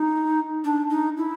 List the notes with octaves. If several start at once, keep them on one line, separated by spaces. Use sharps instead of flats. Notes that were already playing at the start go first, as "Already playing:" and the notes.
Already playing: D#4
D4
D#4
E4